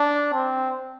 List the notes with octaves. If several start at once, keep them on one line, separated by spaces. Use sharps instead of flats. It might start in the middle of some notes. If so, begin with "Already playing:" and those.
Already playing: D4
C4